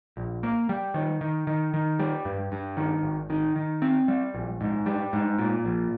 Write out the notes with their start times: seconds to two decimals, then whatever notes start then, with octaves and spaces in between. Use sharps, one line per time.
0.17 A#1
0.43 A#3
0.69 G3
0.94 D#3
1.21 D#3
1.47 D#3
1.74 D#3
1.99 G3
2.25 G2
2.52 G2
2.77 D#3
3.03 G#1
3.30 D#3
3.56 D#3
3.82 C4
4.08 G3
4.34 A#1
4.61 G#2
4.86 G3
5.13 G#2
5.38 A#2
5.65 A#1